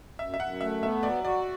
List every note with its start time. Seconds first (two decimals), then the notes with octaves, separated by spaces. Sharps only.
0.19 F#2 E5
0.34 E5
0.40 F#2 F#5
0.61 A3 E5
0.82 B3 E5
1.03 F#3 D5
1.24 F#4 D5